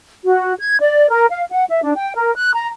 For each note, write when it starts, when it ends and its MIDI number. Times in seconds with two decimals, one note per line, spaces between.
0.25 0.53 66
0.59 0.77 92
0.80 1.09 74
1.10 1.25 70
1.30 1.44 77
1.51 1.64 78
1.71 1.79 76
1.83 1.92 62
1.96 2.15 79
2.15 2.31 70
2.35 2.53 90
2.53 2.67 82